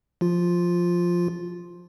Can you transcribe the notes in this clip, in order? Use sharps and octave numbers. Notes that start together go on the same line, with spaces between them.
F3 F4